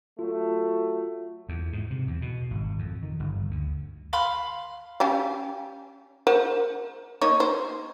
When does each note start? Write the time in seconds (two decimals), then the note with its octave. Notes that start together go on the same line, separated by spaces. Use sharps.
0.19 F#3 A3 F4
1.49 E2
1.73 G#2
1.90 C3
2.07 E2
2.22 B2
2.51 G#1
2.79 F2
3.03 D#3
3.20 G1
3.51 D2
4.13 F5 B5 C6 F6
5.00 C#4 G4 F5
6.27 A#4 C5 F#5
7.21 A#3 D#4 C#5
7.40 C5